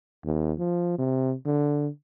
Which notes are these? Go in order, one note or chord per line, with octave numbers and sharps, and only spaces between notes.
D#2
F3
C3
D3